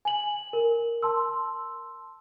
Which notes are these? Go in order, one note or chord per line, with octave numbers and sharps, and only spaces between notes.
G#5 F#7
A#4
A5 C6 E6